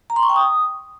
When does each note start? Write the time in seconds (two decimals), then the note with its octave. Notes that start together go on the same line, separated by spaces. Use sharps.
0.10 A#5
0.16 C6
0.23 C#6
0.29 G5
0.36 D#6